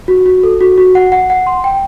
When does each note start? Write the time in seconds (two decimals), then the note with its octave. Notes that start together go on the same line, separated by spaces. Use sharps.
0.08 F#4
0.26 F#4
0.44 A4
0.61 F#4
0.78 F#4
0.95 F#5
1.12 F#5
1.30 F#5
1.47 C6
1.64 G5